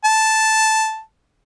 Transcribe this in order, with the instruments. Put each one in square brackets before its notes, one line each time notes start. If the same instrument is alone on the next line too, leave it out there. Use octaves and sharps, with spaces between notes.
[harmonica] A5